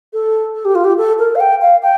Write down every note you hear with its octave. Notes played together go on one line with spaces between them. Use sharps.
A4
A4
G4
F4
G4
A4
A#4
F5
G5
F5
G5